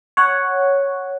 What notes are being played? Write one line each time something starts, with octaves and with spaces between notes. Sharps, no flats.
C#5 F#5